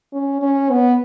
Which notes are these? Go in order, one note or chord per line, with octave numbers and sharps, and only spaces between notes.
C#4
C#4
B3